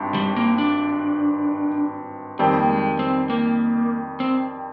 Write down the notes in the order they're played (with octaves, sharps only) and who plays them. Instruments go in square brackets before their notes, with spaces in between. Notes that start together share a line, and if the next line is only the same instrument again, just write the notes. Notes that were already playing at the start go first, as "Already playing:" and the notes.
Already playing: [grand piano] G#1 G2
[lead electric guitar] G3
A#3
D4
[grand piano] F2 D#3 G3 [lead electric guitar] C4
[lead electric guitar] A#3
G#3
C4
A#3
C4